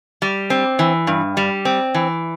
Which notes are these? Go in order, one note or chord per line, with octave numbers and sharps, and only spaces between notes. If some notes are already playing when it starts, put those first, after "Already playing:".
G3
C4
E3
G2
G3
C4
E3